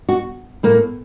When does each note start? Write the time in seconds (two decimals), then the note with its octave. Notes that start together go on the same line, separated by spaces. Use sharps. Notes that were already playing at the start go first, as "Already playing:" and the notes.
0.09 F#4
0.63 A2 A#3